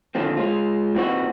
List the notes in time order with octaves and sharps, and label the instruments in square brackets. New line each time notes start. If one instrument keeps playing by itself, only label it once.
[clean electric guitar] A#2 D3 D#3 F3 C4
G#3 F4
A#2 E3 C4 D#4 F4 F#4